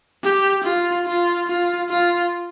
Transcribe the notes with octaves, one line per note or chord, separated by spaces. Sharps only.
G4
F4
F4
F4
F4